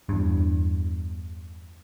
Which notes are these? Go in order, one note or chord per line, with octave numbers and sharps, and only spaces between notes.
E2 G2